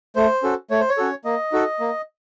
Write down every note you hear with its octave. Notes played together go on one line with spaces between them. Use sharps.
A3 C5
C#4 F#4 A4
A3 C#5
C5
C#5
C#4 F#4 A4
A#3 D#5
D#4 F#4 A4
A#3